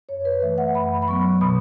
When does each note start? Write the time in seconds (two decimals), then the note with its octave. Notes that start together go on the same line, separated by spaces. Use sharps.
0.09 F#2 C#5
0.25 B4
0.42 E3 A3 E5
0.58 F#5
0.74 F#2 B5
1.02 B5
1.08 F#3 B3 C#6
1.41 B2 B5